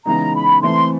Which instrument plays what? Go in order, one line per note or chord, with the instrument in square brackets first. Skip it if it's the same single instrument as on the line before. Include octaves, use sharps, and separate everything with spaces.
[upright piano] C#3 E3 G#3 B3 D#4 [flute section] A#5
[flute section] B5
[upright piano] E3 A3 C4 [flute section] C6